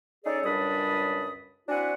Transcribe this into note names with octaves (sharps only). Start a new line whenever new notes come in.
C#4 D#4 G#4 A4 C#5 D5
C#2 F#2 G3 D4 B5 D#6
C4 D4 E4 F#4 F#5 G#5